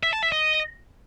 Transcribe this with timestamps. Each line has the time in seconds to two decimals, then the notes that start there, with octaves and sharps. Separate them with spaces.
0.03 E5
0.13 A5
0.23 E5
0.32 D#5